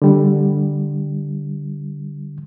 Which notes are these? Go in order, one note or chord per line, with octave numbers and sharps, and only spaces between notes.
D3 G3